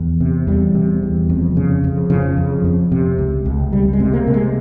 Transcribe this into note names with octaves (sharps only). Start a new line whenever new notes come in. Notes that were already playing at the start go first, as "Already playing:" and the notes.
Already playing: E2
C3
E2 G3
C3
E2
F2
C#3
F2
C#3 F3
F2
F2
C3
C#2
C#2
C#2 G3
G#3
C3
A#3
C3
G#3